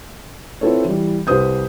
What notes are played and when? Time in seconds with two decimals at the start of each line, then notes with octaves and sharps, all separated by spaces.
0.61 C4 E4 F4 A4 B4 C#5
0.85 E3 G3
1.27 C2 G4 B4 C5 D#6 G6